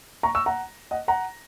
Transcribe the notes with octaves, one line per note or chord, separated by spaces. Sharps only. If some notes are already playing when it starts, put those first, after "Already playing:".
A#5 C#6
C#6 E6
F#5 A#5
D#5 F#5
F#5 A#5